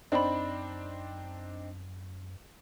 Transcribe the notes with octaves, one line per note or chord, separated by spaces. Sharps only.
F#2 C4 D4 D#4 D5 B5